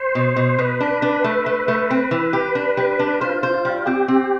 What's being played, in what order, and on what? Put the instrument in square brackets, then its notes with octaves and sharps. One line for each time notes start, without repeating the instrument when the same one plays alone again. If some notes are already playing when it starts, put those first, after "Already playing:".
Already playing: [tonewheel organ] C5
[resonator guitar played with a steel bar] B2
B2
[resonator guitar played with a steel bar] B2 [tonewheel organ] B4
[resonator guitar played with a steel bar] D4
D4
A3
A3
A3
C4
E3
G4
D4
G3
D4
[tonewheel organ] F4 [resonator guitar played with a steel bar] C5
[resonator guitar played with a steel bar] C5
[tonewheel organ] F4
[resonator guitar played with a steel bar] G3
[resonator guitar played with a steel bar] C4 [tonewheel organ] G4
[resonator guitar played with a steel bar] C4